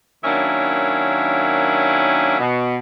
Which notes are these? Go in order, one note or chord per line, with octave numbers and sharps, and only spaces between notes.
D#3 F#3 A#3 C#4 D4 E4
B2